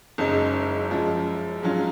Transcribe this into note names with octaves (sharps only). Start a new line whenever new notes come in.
F#1 F#2 C#3 G#3 D#4
F#2 F3 G#3
G#2 F#3 C#4 F4